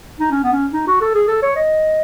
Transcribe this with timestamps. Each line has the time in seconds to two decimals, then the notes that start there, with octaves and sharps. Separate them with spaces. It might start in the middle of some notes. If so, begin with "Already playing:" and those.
0.20 D#4
0.31 C#4
0.43 B3
0.52 C#4
0.73 D#4
0.87 F#4
1.01 A4
1.15 G#4
1.28 A4
1.42 C#5
1.56 D#5